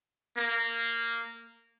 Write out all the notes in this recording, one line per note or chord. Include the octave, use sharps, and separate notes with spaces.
A#3